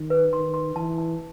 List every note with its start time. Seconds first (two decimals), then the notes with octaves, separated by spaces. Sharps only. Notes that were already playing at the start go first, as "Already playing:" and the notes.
Already playing: D#3
0.10 B4
0.33 D#3 C6
0.54 C6
0.76 E3 A5
0.98 A5